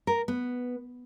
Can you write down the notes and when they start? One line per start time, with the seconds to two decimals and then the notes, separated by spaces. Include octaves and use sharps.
0.07 A#4
0.28 B3